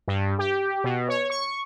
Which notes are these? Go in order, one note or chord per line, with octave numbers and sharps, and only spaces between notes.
G2
G4
B2
C#5
C#6